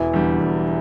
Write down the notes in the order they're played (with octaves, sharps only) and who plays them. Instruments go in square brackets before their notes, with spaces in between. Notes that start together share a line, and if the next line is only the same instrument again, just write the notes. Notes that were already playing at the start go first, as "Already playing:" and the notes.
Already playing: [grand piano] E1 [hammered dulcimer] E3
[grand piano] E2 D3 G3
E1